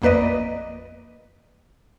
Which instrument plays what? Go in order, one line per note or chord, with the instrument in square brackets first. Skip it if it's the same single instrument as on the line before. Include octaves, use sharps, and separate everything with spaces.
[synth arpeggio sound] A1 F2 A#3 B4 D5 D#5